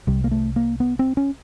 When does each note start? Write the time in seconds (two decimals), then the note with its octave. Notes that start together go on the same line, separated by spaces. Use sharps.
0.07 C2 C3 G3
0.24 A#3
0.31 A3
0.56 A#3
0.80 B3
0.99 C4
1.17 C#4